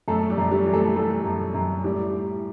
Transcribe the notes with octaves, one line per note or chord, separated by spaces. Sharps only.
F#2 A3 A4
G3 G4
F#2
G3 G4
E3
A3 A4
G3 A3 A4
F#2
F#2
A2 G3 G4
A2